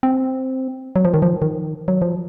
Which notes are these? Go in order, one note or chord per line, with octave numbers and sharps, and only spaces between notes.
C4
F#3
F3
D#3
F3
D#3
F#3
F3